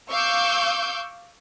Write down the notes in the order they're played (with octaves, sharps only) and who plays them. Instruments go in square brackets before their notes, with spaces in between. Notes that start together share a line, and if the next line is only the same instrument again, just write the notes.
[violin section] F5 C#6 D6 E6 G6